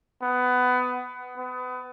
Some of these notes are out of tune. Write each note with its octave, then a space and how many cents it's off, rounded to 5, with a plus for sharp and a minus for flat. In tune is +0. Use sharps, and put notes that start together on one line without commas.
B3 +20
B3 +30